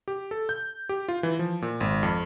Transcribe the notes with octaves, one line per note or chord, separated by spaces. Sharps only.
G4
A4
G6
G4
F4
E3
F3
A#2
G#1
F2